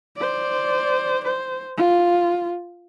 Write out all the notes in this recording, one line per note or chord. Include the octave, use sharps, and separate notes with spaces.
C5 D5
C5
F4